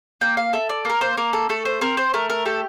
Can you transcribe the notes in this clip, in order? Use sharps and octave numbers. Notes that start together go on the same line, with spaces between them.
A#3 G5
F5
A4 E5
D5
A#3 A#4
C5
A#3 A#4
A4
A3 A4
C5
C4 A#4
C5
A3 A#4
A#4
G4 A4